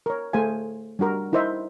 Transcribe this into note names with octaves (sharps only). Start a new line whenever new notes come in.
A#4 C#5
A3 G#4 C5 F5 G#5
G3 D4 F#4 A#4
D#4 E4 A#4 C5 D#5 E5